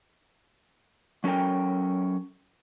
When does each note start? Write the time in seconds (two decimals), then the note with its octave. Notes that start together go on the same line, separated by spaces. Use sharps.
1.24 F#3 C#4 A4 A#4 G5